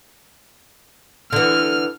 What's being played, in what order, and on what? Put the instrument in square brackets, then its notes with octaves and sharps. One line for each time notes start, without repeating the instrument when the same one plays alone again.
[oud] D3 E3 [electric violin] F6